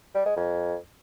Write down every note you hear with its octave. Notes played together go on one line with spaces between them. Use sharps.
G3
G#3
F2